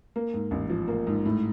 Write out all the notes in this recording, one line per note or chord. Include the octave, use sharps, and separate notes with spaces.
A#3
G#2
A1
F3
A#3
G#2
A2